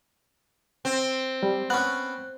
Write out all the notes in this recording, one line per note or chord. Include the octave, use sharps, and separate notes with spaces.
C4
G3
B3 C#4 F#6